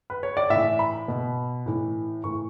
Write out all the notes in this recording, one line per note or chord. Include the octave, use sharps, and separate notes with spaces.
B4
C#5
D5
A2 E3 E5
B5
B2
A2 E3
A2 E3 C#6